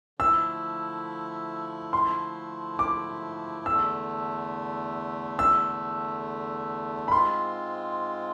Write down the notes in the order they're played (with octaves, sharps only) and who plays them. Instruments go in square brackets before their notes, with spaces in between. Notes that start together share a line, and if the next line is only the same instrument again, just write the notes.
[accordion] D3 F3 A3 E4 [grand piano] E6
[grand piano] C6
D6
[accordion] E2 D3 A3 [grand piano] E6
[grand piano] E6
B5
[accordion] G#2 G#3 C4 F4 [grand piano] C6